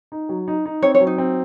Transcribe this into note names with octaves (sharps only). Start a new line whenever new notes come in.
D#4
F#3
D#4
D#4
C4 C#5
C#5
F#3
D#4
C4